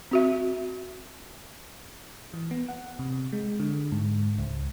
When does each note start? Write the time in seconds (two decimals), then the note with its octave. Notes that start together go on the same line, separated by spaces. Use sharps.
0.11 C4 F#4 E5
2.33 E3
2.51 B3
2.68 F#5
2.99 C3
3.32 G#3
3.59 D3
3.92 G#2
4.38 C#2